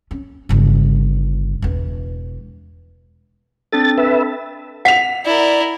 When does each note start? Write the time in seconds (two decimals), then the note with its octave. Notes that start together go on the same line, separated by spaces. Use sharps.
0.11 C#4
0.49 G1 C#3
1.62 E1 E3
3.73 C4 D4 A4 A6
3.98 B4 E5
4.85 F#5 B6 F7
5.25 E4 A#4 D5